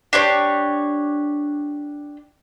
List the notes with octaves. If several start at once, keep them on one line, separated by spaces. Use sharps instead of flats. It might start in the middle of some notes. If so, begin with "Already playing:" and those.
D4 G4 C#5